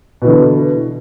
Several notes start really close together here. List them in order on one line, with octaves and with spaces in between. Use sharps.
B2 E3 D3